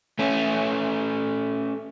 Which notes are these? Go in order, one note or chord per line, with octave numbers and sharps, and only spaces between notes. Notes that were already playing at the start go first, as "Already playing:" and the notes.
A3 C#4